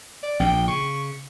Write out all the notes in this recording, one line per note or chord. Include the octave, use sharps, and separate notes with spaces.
D5
A#1 A#2 G5
C#3 C#6